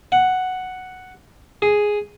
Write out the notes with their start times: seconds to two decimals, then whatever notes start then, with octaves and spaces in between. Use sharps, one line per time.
0.12 F#5
1.62 G#4